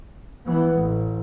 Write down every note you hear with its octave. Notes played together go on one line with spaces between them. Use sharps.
E3 B3
A1